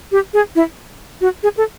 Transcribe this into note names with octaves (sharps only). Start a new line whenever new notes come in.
G4
G#4
E4
F#4
G#4
A4